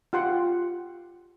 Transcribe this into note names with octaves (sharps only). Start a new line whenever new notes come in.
F4 G4 F#5 G5 C6